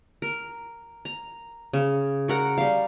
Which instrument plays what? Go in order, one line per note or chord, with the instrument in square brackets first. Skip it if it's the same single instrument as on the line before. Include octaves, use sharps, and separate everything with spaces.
[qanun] A#4
A#5
C#3
F#4 A#4 F#5
G3 F5